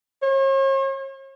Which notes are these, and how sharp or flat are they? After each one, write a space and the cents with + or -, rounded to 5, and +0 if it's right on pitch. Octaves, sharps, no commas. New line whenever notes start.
C#5 -45